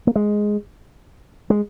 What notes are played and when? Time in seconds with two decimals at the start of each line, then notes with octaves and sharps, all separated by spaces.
0.07 A#3
0.16 G#3
1.50 G#3